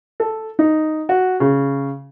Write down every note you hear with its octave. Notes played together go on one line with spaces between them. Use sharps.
A4
D#4
F#4
C#3